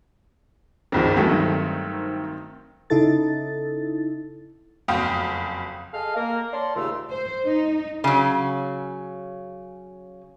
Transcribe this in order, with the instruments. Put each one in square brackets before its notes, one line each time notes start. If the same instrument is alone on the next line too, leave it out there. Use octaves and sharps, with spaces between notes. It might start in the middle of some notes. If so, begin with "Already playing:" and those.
[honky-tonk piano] G#1 C#2 D#3 [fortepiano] F3 G#3 C4
[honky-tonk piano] E2 G#3 A4 [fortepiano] G2 F#3 A3
[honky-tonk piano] D#3 C4
[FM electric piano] C#3 D#4 E4 A4 A6
[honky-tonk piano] F#1 F2 F#4 F5 G5 D#6
[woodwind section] G#4 A4 D#5 F5
A#3 A#4
C#5 D5 A5 C6
D#2 G#2 C#3 A3 F4 E6
[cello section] C5
D#4
[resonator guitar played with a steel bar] C#3 F#3